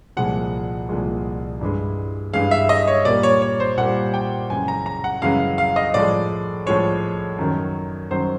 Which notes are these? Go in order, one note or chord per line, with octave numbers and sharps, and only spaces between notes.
C2 A#2 F3 G#3 F#5
C2 A#2 F3 G#3
G2 E3 G#3
G2 E3 G#3 F5
E5
D#5
C#5
A#2 G3 A#3 D5
C#5
C#5
C5
A#2 G3 A#3 F#5
G5
F#2 C#3 E3 G#3 G#5
A#5
A#5
F#5
F#2 C#3 E3 G#3 F5
F5
D#5
A2 F3 G#3 D5
A2 F3 G#3 C#5
F#2 D#3 F#3
F#2 D#3 F#3 C5